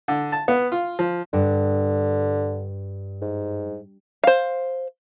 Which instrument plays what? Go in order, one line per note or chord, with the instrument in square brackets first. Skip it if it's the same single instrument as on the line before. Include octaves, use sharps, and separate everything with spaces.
[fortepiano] D3
A5
B3
F4
F3
[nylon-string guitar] G2 [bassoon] D3
[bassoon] G#2
[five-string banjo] C5 F5